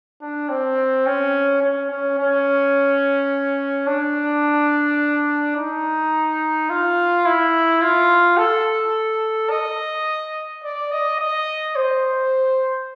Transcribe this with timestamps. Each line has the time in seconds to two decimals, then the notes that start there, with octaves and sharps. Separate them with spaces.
0.22 D4
0.49 C4
1.06 C#4
1.62 C#4
1.91 C#4
2.19 C#4
3.87 D4
5.57 D#4
6.70 F4
7.26 E4
7.82 F4
8.38 A4
9.50 D#5
10.64 D5
10.92 D#5
11.19 D#5
11.76 C5